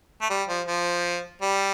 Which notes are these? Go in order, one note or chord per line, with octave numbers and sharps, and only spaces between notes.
A3
G3
F3
F3
G3